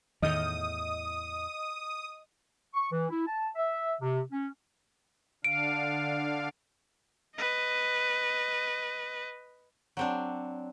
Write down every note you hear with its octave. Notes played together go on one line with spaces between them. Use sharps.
E2 A2 D#3 D#5 D#6 F6 G6
C#6
E3
E4
A5
E5
C3
C#4
D3 D4 F5 D7
B4 D#5
F#3 C4 D4